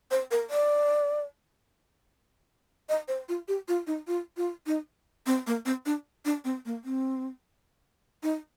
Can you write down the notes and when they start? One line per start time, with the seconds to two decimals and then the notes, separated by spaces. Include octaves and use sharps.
0.11 C5
0.31 A#4
0.50 D5
2.89 D#5
3.08 C5
3.29 F4
3.48 G4
3.68 F4
3.87 D#4
4.08 F4
4.37 F4
4.67 D#4
5.26 C4
5.47 A#3
5.66 C4
5.86 D4
6.25 D4
6.45 C4
6.66 A#3
6.85 C4
8.23 D#4